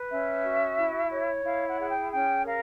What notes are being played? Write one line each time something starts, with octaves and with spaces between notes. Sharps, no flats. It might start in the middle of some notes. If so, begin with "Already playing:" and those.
Already playing: B4
C#4 E5
F#4
E4
C#5
E4 F5
F#5
G#4 F#5
G5
C#4 G5
A#4 F5